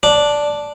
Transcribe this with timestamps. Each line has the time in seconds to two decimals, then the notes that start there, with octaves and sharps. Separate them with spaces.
0.03 D4